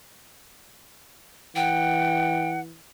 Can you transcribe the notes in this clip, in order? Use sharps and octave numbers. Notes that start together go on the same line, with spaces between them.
E3 F#5 G5